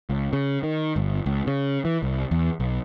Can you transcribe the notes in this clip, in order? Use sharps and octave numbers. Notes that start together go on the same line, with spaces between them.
C#2
C#3
D#3
G1
C#2
C#3
E3
C2
E2
B1